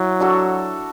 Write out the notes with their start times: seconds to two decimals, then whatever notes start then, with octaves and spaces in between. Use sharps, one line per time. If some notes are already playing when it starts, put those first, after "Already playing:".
Already playing: F#3 E4
0.20 D4 F#4 A4